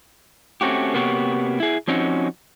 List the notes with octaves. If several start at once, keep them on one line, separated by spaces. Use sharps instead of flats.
A3 C4 C#4 F#4 G4
C3 A#3 B3 F#4 G4 C#5
E4 G#4
F3 C4 C#4 D#4 F#4